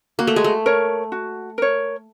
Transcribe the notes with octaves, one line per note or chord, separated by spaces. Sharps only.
A#3 F#4
A3
G#3
A3
A#4 C#5
F#4
A#4 C#5